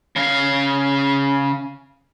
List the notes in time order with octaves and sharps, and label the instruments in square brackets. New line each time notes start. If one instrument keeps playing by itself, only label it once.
[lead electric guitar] C#3 F5